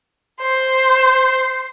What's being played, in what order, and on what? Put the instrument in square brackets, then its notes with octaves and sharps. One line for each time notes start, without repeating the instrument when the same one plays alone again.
[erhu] C5